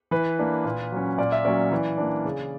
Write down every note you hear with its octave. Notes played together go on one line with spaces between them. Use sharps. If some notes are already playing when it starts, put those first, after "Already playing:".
E3 B4
A#3 D4
A#2
F#3 C#4
A#2 D5
E5
F#3 A#3 C#4 D5
E3
A#3 D4
C#3